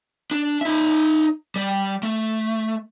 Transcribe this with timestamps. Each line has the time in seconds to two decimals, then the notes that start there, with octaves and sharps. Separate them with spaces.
0.31 D4
0.61 D#4 E5
1.56 G3
2.03 A3